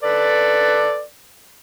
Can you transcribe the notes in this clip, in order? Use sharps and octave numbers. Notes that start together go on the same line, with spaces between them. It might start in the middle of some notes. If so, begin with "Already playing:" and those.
A4 B4 D5